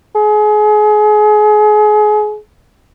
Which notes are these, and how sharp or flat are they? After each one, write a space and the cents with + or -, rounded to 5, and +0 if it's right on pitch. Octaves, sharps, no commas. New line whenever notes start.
G#4 +30